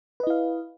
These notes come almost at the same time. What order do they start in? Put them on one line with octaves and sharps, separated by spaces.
B4 D#5 E4 F5